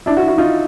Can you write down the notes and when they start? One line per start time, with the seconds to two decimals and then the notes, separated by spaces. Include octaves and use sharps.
0.06 D4 E4
0.17 E4 F#4
0.27 E4 F#4
0.38 D#4 F4